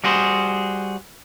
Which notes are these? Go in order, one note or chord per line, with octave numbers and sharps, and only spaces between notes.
G3 F#4 G#4 C5